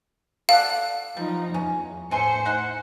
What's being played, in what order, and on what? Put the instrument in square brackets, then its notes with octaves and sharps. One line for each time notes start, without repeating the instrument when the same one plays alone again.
[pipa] A4 D5 F#5 [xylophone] F5
[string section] F3 D#4 [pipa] G3
[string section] E2 [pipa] C#4
[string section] A2 C5 C#7 [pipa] D3 G#5 C6
[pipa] D#4 F#5 G#5